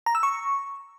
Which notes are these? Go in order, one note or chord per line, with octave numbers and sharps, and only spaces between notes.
A#5
E6
C#6